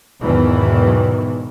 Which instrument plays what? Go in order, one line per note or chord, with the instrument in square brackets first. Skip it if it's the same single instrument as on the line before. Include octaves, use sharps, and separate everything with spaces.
[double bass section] E2 G#2 B2 D#3 E3 F#3